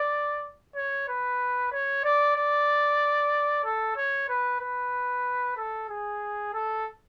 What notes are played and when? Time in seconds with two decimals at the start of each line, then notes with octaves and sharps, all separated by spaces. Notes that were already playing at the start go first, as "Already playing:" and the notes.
Already playing: D5
0.76 C#5
1.09 B4
1.72 C#5
2.04 D5
2.36 D5
3.65 A4
3.97 C#5
4.29 B4
4.61 B4
5.57 A4
5.89 G#4
6.54 A4